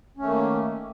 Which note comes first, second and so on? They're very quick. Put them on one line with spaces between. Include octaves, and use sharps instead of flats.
C#4 A3 D#3 A#3